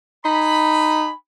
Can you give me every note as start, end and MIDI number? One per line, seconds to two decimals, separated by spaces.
0.25 1.09 63
0.25 1.15 80
0.25 1.15 83